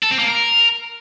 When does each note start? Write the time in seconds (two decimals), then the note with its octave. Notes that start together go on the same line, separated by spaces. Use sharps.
0.03 A4
0.11 C4
0.19 A#3
0.27 A#4